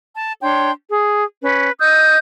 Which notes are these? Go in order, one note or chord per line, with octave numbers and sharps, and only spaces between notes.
A5
D4 C#5 G5 C6
G#4
C#4 B4
D#5 D#6 E6 G6